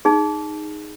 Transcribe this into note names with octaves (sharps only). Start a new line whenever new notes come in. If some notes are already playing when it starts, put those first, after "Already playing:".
D#4 G#4